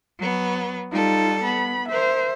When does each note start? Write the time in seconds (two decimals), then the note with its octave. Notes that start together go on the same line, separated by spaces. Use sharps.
0.18 F#3 B3
0.91 G3 D#4 F4 A4
1.43 B3 B5
1.88 A#4 C5 E5